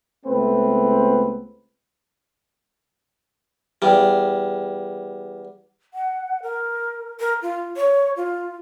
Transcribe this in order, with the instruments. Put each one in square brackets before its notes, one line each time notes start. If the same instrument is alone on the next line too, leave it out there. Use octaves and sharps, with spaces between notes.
[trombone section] C#2 A3 B3 C4 B4
[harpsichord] E2 G3
[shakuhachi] F#5
A#4
A#4
F4
C#5
F4